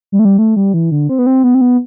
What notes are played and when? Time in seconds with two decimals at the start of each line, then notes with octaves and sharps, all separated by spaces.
0.12 G3
0.19 A3
0.25 G3
0.39 A3
0.56 G3
0.74 E3
0.91 D3
1.09 C4
1.19 B3
1.26 C4
1.44 B3
1.55 C4
1.61 B3